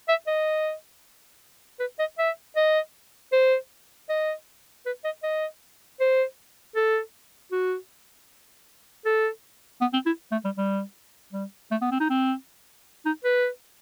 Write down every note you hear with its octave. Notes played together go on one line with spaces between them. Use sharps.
E5
D#5
B4
D#5
E5
D#5
C5
D#5
B4
D#5
D#5
C5
A4
F#4
A4
B3
C4
E4
A3
G3
G3
G3
A3
B3
C4
D#4
C4
D#4
B4